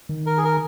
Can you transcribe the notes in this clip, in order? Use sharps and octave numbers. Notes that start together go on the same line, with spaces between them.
D#3
A#4
G#4
A#4